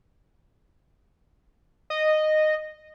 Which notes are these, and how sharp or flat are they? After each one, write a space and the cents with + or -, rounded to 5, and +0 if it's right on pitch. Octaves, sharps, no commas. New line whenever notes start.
D#5 -10